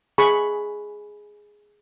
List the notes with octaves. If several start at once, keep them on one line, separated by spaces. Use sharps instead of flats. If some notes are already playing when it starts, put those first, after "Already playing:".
G#4 B5 C#6